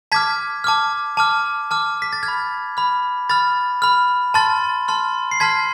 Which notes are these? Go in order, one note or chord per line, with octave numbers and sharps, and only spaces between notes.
A5 D6 F6 G#6 B6
A5 D6 F6
A5 D6 F6
A5 D6 F6
B6
A6
F6 G#6
B5
B5 F6
B5 F6 A6
B5 F6
A5 C6 F6 A6
A5 C6 F6
C7
A5 C6 F6 G#6 B6